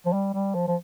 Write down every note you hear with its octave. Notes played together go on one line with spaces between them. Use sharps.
F3
G3
G3
F3
F3